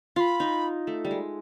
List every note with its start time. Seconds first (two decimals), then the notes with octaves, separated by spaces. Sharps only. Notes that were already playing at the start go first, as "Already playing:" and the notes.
0.16 F4 C6
0.20 B5
0.40 D#4
0.87 A3
1.05 G3
1.11 G#3